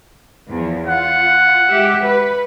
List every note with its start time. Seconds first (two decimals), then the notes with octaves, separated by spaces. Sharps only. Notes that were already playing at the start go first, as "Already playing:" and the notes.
0.50 E2 F3
0.87 F4 F#5
1.69 G#3 G4 E5
2.04 B4